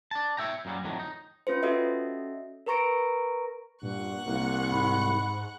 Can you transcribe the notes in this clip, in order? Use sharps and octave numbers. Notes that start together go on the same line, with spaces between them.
D5 A5
C#5 E5 G5 A#5
F#2 A#2 D3 F#3 G3
F2 A2 D3 D#3 F#3
D#4
C#4 F4 B4 C5
C#4 F#4 A4 D#5 E5
A#4 B4 A#5 C#6 A#6 D7
G2 A#2 F#5 C#6 F#6
C2 A#3
G#2 B5